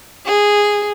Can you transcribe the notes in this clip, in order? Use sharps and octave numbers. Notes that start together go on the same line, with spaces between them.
G#4